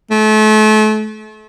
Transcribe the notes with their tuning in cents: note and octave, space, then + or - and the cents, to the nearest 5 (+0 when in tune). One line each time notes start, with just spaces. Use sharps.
A3 -35